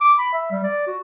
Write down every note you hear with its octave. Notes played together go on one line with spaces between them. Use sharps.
D6
B5
E5
G3
D5
F#4